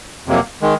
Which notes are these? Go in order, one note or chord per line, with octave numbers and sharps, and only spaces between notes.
F2 C3 F#3 A#3
D#3 G#3